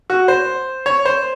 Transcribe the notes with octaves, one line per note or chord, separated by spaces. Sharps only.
F#4
C5
C#5
C5